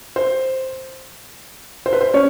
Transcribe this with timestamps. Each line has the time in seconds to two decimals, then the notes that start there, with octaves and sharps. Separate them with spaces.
0.16 C5
1.86 C5
1.93 B4
2.01 C5
2.14 C#4 C#5